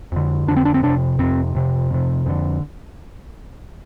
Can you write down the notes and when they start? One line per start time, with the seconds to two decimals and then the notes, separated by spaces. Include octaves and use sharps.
0.12 F2 D3
0.47 F2 D3 D4
0.57 C4
0.65 D4
0.74 C4
0.83 F2 C3 D4
1.19 F2 C3 C4
1.55 F2 C3
1.90 F2 C3
2.26 F2 D3